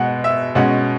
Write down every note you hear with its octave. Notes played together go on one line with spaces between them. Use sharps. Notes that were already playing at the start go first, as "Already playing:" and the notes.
Already playing: B2 G#3 B3 F#5
E5
B2 G#3 C#4 F#5